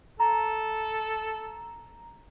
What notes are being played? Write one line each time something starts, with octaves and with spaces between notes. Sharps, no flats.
A4 A#5